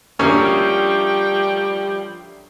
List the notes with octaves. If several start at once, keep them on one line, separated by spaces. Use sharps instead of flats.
D2 F3 G3 A#3 C#4 G5